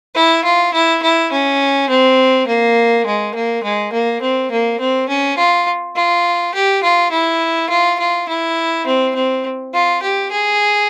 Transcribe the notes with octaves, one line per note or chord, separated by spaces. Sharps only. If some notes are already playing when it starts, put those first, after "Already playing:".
E4
F4
E4
E4
C#4
C4
A#3
G#3
A#3
G#3
A#3
C4
A#3
C4
C#4
F4
F4
G4
F4
E4
F4
F4
E4
C4
C4
F4
G4
G#4